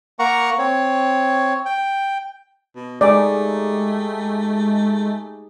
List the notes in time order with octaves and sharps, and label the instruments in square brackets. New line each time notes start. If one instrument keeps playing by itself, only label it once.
[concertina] A#3 A#4 F#5 A#5 C#6
C4 C#5
G5
[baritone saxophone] B2
[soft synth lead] G#3 [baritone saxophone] A3 [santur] D#4 G4 G#4 [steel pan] D5